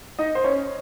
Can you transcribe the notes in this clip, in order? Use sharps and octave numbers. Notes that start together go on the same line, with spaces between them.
D#4 D#5
C5
C#4 C#5